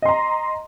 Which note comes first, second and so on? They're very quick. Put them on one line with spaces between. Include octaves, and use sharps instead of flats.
D#5 C6 A#5